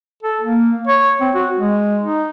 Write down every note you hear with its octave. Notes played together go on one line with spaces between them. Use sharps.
A4
A#3
C#5
C4
F#4
G#3
D#4